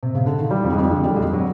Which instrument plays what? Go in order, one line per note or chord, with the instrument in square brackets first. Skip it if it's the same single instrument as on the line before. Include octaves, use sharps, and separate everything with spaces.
[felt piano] C3
C#3
D3
D#3
[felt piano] E3 [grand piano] G3
[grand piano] F2 [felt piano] F3
[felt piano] G#3
[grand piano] F2 [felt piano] G3
[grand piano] D3 [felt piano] G#3
[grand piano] G3 [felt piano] A3
[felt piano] G#3
[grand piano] F2
[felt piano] F#3